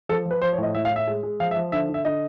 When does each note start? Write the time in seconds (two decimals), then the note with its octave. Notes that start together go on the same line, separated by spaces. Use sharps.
0.09 F3 A4
0.25 F3
0.31 B4
0.42 F3 C5
0.53 C#5
0.58 A2 D#5
0.75 A2 E5
0.85 F5
0.90 A2
0.96 E5
1.07 G#3
1.23 G#3
1.40 F3 F5
1.51 E5
1.56 F3
1.72 D3 E5
1.89 D3 E5
2.05 D3 D#5